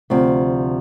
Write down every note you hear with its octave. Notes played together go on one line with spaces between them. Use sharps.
D2 C3 F3